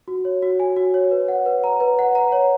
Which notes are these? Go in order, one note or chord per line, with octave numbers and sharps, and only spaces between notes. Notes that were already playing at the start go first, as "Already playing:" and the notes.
F#4
C#5
F#4
G#5
F#4
C#5
B4
F#5
B4
A#5
B4
F#5
A#5
C#5